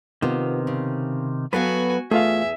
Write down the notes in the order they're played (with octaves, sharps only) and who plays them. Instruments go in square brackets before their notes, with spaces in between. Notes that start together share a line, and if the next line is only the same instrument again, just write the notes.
[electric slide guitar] C3 D#3 [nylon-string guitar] B3 F4
[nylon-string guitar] C#3
[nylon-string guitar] F#3 B3 F5 [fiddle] F#4 G#5 [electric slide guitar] A4 B4
[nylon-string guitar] E2 [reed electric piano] A3 F4 F5 [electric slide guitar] G#4 [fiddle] E5